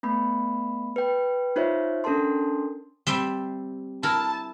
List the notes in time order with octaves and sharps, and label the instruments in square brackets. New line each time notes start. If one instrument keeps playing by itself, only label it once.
[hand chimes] A3 B3 B5
B4 G5
D#4 F4 C5 C#5 E5
C#4 D4 A4 A#4 A5 C6
[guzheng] G3 C4 E5
[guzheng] E4 A#4 [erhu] A5